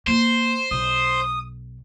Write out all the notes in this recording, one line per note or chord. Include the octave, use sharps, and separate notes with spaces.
A#3 F4 C5
B1 D#6